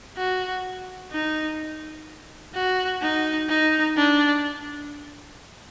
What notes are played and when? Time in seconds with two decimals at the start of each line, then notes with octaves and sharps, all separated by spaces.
0.17 F#4
1.12 D#4
2.54 F#4
3.02 D#4
3.49 D#4
3.97 D4